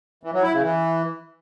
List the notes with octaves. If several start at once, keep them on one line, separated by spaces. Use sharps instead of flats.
E3
F#3
E4
C#3
E3